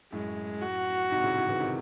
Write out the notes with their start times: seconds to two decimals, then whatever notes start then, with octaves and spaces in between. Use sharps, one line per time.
0.12 F#2 A2 G#3
0.62 F#4
1.11 G#2 C3
1.24 A2 C#3
1.35 A2 C#3
1.48 C#3 E3
1.60 C3 D#3